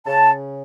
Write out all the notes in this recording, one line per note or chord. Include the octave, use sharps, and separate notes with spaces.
C#3 A5